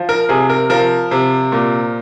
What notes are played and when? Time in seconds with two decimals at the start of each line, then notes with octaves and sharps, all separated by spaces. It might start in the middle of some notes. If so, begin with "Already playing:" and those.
Already playing: F3
0.09 A#4
0.29 C3 G#4
0.50 A#4
0.70 F3 A#4
1.11 C3
1.52 A#2